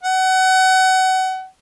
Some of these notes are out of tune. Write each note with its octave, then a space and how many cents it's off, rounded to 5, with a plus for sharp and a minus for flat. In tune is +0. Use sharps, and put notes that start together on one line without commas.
F#5 +30